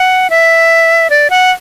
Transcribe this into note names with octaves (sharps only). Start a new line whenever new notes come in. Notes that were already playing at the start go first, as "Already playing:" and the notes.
Already playing: F#5
E5
D5
F#5